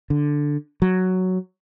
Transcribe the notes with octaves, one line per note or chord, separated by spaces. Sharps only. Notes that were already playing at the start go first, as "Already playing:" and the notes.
D3
F#3